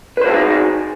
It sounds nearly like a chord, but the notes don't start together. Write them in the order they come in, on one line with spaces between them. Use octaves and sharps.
B4 C5 F#4 G#4 D#4